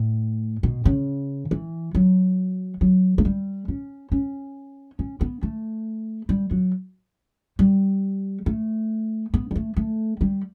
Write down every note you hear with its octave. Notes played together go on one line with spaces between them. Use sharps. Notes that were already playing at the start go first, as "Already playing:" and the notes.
Already playing: A2
B2
C#3
E3
F#3
F#3
A3
G3
C#4
C#4
C#4
B3
A3
G3
F#3
G3
A3
B3
G3
A3
A3
G3